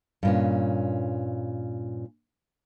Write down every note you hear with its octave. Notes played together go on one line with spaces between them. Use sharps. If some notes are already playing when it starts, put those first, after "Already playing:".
G2 A#2 C#4